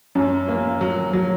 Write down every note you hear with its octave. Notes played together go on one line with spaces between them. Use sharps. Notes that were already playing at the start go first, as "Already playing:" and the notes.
F#2
A#3
F#3
F#3